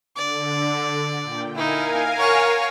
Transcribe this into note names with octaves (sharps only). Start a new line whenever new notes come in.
D3 D5
A#2 G5
D#4 E4 A#4 F5 G#5
C#5 F#5